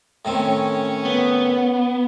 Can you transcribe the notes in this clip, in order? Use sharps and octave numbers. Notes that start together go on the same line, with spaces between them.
A2 D#3 C4 C#4 C#5
B3